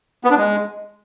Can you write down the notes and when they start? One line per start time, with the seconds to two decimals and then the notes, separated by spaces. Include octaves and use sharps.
0.24 B3
0.30 D4
0.37 G#3